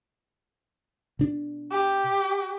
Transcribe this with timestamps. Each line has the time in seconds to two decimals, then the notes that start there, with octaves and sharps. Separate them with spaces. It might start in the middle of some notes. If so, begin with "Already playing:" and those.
1.19 B2 D4
1.72 G4